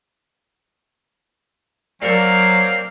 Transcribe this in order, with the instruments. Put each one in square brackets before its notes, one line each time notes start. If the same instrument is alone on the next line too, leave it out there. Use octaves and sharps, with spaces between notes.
[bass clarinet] F#3 [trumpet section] A#3 C4 F5 [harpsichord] D4 A4 A#4